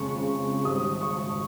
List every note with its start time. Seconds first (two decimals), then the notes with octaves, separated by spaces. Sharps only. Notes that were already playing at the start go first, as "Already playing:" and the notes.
Already playing: F2 C#3 G#3 C#6
0.64 G#1 G#2 G3 D#6
1.01 C#6